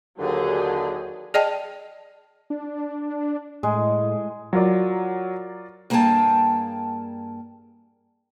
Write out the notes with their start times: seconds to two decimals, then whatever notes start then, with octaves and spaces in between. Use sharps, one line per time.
0.19 D#2 D3 F#3 G4 G#4
1.34 G#4 D5 D#5 G5 A5
2.50 D4
3.63 A2 G#3
4.53 F#3 F4 A#4 D5
5.90 G2 A#3 G#4 F5 G5 A5